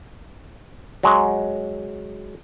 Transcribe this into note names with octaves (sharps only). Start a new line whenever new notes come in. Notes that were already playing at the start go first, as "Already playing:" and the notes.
F#3 G#3